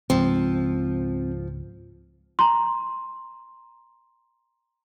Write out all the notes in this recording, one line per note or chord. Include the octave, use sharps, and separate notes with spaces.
C#2 G#2 F3 C4
A#5 C6